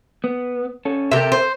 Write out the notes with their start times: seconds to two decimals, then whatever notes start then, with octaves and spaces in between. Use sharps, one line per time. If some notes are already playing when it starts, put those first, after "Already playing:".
0.24 B3
0.85 C#4 A4
1.11 C3 G4 A4 A#4 E5
1.32 C5